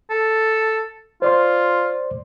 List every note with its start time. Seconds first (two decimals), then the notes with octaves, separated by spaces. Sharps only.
0.10 A4
1.22 F4 C5 D5 C6